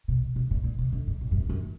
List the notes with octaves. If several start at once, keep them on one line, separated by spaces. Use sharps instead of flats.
B2
B2
A#2
A#2
B2
D3
G#2
A#2
F#2
G#2
F#2